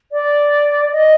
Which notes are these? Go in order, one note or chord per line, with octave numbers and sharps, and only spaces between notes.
D5
D#5